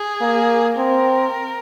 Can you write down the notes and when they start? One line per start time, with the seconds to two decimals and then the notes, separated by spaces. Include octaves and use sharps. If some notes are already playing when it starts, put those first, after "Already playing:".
Already playing: G#4
0.21 A#3
0.77 C4 A#4